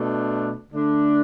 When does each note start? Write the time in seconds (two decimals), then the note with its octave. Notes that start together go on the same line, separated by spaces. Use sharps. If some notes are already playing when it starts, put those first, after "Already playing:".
Already playing: B2 A3 D4
0.73 D3 A3 D4